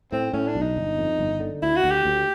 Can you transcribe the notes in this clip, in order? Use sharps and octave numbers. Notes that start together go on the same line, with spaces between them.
A2 C4
A2 C#4
D4
B1
D#4
G1
F2
G1
D3
D2 E4
F#4
D2
G4
D2